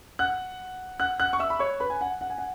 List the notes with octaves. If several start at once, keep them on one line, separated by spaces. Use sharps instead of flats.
F#5 F#6
F#5 F#6
F#5 F#6
C#6
E5 E6
B5
C#5 C#6
B4 B5
G#5
F#5
F#5
G#5
F#5